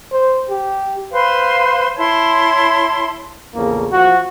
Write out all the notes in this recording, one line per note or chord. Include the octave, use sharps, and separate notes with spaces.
C5
G4
B4 C5 F5 C6
E4 C#5 A5 C6
A#1 E2 C#3 A3 A#3
F3 F#4